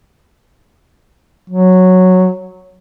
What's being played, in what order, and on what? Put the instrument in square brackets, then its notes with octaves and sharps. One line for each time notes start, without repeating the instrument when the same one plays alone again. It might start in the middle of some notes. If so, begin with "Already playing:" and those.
[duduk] F#3